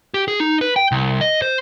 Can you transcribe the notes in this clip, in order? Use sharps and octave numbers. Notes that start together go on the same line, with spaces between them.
G4
G#4
D#4
B4
G5
C2
D#5
C5